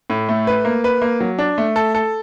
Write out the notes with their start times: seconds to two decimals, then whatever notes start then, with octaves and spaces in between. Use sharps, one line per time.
0.10 A2
0.29 A3
0.47 B4
0.65 A#3
0.84 B4
1.02 A#3
1.20 F#3
1.39 D4
1.58 A3
1.76 A4
1.95 A4